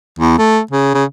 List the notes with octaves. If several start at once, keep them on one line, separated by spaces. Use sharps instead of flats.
E2
A3
C#3
C#3